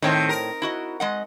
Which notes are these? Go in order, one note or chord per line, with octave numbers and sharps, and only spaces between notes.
A2 D#3 C4 C#5
A#4
E4 F#4 D#5
G#3 D#5 F#5